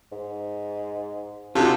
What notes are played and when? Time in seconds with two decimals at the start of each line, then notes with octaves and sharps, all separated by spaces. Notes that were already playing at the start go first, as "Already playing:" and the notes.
0.12 G#2
1.55 C3 D#4 F4 F#4 A4